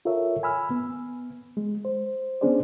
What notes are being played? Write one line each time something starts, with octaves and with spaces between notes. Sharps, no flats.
F4 A4 A#4 C#5 E5
G#5 B5 E6 F6
B3
G#3
C5
B3 C#4 D4 G#4 C5 D5